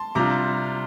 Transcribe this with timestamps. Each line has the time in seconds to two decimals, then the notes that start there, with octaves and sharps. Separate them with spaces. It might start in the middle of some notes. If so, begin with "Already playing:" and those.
Already playing: A5 C6
0.15 C3 G3 D4 F4 A#5 D6